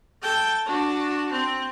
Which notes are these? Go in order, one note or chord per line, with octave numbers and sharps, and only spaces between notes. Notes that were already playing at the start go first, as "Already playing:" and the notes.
A4 G5
D4 F#4
C4